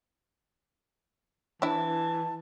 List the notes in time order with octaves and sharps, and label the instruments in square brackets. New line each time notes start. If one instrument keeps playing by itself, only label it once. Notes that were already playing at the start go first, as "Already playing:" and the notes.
[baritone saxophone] E3 [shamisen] D4 E4 [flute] A5